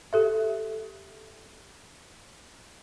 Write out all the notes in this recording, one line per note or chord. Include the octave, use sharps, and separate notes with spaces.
G4 A4 E5